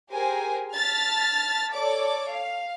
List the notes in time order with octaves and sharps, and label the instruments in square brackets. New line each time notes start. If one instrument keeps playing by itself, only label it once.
[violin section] G4 G#4 A#4 C5 G#5
A5 F6 A6 B6
A4 C#5 D5 D6
F5